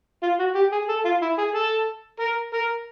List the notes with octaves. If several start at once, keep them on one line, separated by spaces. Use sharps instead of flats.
F4
F#4
G4
G#4
A4
F4
E4
G#4
A4
A#4
A#4